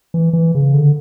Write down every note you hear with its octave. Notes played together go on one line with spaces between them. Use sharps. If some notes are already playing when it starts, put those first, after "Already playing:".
E3
E3
C#3
D3